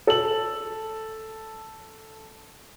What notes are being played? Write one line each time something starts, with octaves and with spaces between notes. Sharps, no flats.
A4 F#7